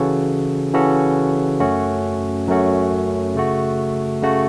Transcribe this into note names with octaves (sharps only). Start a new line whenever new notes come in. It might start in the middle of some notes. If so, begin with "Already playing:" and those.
Already playing: C#3 E3 C#4 F#4 A4
C#3 E3 C#4 F#4 A4
F#2 F#3 A3 C#4 F#4
F#2 F#3 A3 C#4 F#4
C#3 A3 F#4
C#3 A3 F#4